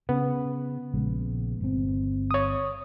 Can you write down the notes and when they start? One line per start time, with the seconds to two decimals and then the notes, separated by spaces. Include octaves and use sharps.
0.09 C#3 B3
0.94 A#1 C#3 G#3
1.60 G1 C4
2.31 C#5 D#6